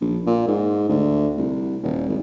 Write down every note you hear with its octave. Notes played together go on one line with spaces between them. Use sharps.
A#1
A#2
G#2
D2
C2
D#1
G#1